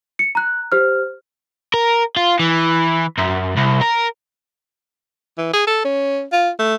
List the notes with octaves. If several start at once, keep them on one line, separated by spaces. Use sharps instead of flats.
C#7
A#5 F#6
G4 C5 F6
A#4
F4
E3
F#2
C2
A#4
E3
G#4
A4
C#4
F4
A3